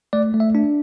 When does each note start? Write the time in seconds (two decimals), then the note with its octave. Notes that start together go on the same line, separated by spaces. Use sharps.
0.13 A3 D5
0.34 A3
0.40 E5
0.55 D4